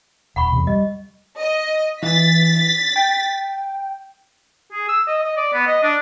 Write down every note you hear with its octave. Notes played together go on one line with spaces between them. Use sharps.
D#1 F#5 B5 C#6
E2 C3
G3 D#5
D#5
E3 A6 B6
G5
G#4
E6
D#5
D#5
D5
B3
D#5
D4